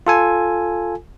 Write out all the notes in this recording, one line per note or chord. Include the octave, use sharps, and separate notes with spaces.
F4 A4 G#5